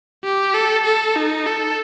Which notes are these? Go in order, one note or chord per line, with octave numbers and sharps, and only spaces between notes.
G4
A4
A4
D#4
A4